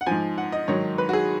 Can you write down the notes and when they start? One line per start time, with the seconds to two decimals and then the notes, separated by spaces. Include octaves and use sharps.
0.01 F#5
0.07 G#2 F3 G#5
0.38 F#5
0.52 D#5
0.68 G#2 D#3 F#3 C#5
0.98 B4
1.09 F#4
1.13 G#4